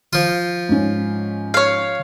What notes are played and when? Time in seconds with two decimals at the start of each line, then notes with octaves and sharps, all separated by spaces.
0.13 F3 F4
0.69 G#2 C#4
1.54 C#5 F5